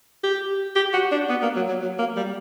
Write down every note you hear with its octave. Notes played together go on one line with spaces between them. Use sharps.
G4
G4
F#4
D4
B3
A#3
F#3
F#3
F#3
A#3
G3